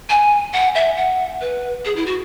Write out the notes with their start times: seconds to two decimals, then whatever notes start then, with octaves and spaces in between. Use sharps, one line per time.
0.10 G#5
0.53 F#5
0.75 E5
0.97 F#5
1.41 B4
1.85 G#4
1.96 E4
2.06 F#4